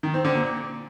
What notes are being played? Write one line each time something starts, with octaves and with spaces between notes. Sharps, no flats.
D#3
C4
D3
A#2